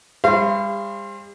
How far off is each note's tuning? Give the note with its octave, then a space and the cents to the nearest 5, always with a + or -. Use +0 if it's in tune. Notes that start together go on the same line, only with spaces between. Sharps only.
G3 +45 C5 +25 F5 -35